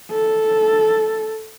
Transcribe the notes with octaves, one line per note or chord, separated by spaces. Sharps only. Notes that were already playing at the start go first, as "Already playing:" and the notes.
A4